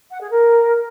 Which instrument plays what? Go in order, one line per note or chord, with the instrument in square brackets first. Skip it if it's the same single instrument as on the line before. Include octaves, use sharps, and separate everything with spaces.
[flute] F#5
G#4
A#4